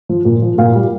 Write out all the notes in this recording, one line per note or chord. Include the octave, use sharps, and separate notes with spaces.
F3
A#2
F3
A#2 F5
G3